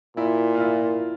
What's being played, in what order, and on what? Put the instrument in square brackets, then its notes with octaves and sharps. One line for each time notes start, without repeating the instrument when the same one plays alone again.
[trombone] A#2 [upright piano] E4
[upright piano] F4
E4